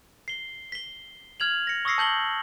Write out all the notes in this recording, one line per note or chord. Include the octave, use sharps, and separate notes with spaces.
C7 G7
B6 G7
F6 G#6 F7 F#7
A#6 C#7
C#6 D#6 E6 A#6 C7 C#7
A5 G6 F#7 G7